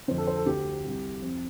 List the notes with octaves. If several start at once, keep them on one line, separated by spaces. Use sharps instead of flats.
F2 D3 C5
A4
C5
A4
D2 D3 G4
C2 C3
F2 C3 C4